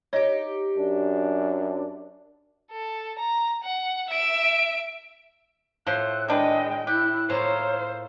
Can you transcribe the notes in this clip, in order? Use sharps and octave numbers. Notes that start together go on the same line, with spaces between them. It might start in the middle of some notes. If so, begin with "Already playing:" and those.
D#4 G4 C#5 D#5
F#2 D4
A4
A#5
F#5
E5 D7
A2 F3 C5 F#6
D#3 G#3 D4 B4 D#5 G5
E4 G4 F#6
A2 A#3 F4 C5 C#5